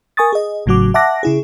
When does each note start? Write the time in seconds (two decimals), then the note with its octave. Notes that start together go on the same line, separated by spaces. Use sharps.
0.17 A#4 G#5 C#6 D#6 A6
0.33 G#4 D#5
0.66 G#1 A2 C#3 F#3 F#4 D6
0.94 E5 F#5 A5 D6 F#6 A#6
1.23 C#3 E4 G#4